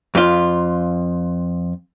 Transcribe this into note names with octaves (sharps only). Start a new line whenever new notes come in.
F2 F4